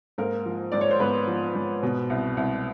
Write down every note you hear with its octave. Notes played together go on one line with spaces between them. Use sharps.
G#2 A#3 A#4
F3
G#2 D5
C#5
C5
G#2 B3 B4
F3
G#2
B2
C2
C2